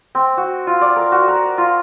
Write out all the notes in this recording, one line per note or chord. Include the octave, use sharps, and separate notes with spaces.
C4
F#4
F4
D5
A#4
F#4
A#4
F4